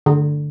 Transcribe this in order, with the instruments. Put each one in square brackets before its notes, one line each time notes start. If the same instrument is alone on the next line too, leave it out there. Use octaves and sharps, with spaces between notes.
[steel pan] D3